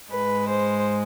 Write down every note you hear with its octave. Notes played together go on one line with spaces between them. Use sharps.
G#2 G#3 B4
C5